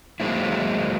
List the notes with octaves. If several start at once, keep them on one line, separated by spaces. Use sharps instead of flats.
F#3 G#3 A#3 C4 E4